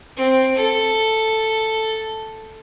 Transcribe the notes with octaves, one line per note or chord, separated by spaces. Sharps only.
C4
A4